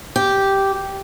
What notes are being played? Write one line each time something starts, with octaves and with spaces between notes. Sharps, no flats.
G4